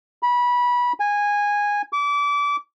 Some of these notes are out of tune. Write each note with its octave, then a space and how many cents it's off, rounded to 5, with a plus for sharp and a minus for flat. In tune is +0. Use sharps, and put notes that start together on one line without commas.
B5 -20
G#5 -15
D6 -30